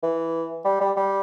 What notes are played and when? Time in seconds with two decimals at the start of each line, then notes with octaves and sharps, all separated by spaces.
0.03 E3
0.65 G3
0.81 G3
0.97 G3